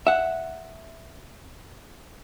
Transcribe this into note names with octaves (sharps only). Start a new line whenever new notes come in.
E5 F#5